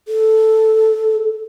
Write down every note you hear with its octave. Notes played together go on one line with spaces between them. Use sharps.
A4